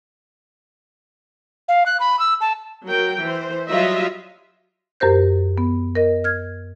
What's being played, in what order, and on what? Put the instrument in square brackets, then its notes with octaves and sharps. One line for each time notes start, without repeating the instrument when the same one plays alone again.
[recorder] F5
F#6
B5
E6
A5
[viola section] F#3 A#4 G5
E3 C5
F#3 G3 F4 D#5 E5
[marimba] F#2 G4 A#4 C5 G6
B3
A#4 D#5
F6 G#6